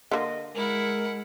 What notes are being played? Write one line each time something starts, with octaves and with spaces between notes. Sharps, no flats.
D3 A#3 D#5
G#3 E4 A#4 F#5